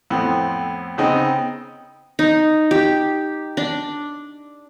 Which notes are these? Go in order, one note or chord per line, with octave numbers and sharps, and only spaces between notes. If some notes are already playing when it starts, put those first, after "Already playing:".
F2 A2 B3 C4
C#3 B3 C4 D#4
D#4
G4
D4